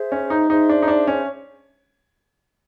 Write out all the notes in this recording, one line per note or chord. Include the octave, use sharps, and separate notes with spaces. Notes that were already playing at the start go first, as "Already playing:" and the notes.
Already playing: G#4 C5 E5
C#4
D#4
D#4 G#4 C5 E5
D4
D#4
D4
C#4